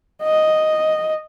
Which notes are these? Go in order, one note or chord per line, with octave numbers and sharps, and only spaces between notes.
D#5